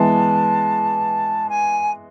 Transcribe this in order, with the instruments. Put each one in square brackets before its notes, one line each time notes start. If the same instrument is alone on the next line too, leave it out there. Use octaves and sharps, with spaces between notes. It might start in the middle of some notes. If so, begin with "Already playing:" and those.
Already playing: [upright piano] E3 G#3 B3 [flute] A5
[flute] G#5